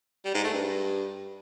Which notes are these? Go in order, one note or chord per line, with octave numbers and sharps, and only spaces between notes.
G3
G#2
A3
G2